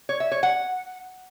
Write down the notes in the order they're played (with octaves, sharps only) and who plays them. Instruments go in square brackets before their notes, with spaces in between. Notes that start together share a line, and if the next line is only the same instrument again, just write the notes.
[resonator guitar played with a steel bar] C#5
E5
C#5
F#5